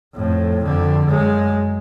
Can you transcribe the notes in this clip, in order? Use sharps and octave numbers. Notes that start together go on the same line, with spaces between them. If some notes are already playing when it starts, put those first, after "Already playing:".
F2 A2
F2 D3
F#2 G#3